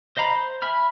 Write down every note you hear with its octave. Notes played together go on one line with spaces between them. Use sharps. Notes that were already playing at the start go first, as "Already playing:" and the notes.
C5 D#5 F5 A#5 B5
C5
E5 G#5 B5 F6